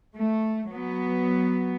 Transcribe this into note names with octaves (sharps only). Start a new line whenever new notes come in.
A3
F#3 B3